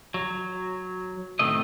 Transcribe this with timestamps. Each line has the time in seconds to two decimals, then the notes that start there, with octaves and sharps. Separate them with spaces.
0.14 F#3
1.39 A2 C3 D#3 A3 D#5